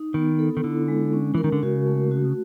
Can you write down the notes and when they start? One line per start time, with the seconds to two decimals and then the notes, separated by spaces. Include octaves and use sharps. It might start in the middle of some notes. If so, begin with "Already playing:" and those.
Already playing: D#4
0.14 D#3 B3
0.39 A4
0.57 D#3
0.64 D3 E4
0.88 G#3
1.13 C#4
1.35 E3 A#4
1.44 D#3
1.52 D3
1.63 C#3 F#4
1.87 A3
2.11 F#4